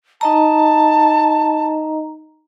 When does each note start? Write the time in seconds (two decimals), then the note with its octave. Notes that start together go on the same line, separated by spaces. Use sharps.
0.21 D#4 D#5 A5 A#5